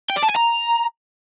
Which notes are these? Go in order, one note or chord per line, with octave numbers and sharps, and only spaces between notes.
G5
D5
A5
G#5
A#5